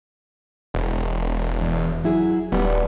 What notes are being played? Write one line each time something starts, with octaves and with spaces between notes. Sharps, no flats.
E1
E2
F#3 E4 G#4
D#1 G3 B3